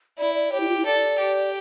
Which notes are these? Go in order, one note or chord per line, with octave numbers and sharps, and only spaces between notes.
E4 D5
D5
G4 C#5
E4
F4
E4
A4 D5
G4